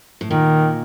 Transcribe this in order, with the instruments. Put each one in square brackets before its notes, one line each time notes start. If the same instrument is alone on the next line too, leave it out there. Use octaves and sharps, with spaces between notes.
[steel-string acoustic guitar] A2
[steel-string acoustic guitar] A#2 [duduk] D#3